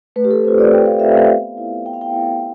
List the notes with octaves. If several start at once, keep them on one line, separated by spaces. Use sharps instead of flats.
A3 B4
G4
A4
C4 F4 C5
D5
A3 G5
F5
C4 F4 E5
F5
B3
E4
B3 G5
F5
G5
E4